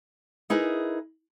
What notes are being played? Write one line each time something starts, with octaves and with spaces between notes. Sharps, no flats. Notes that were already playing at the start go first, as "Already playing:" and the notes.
D#4 E4 G#4 A#4 B4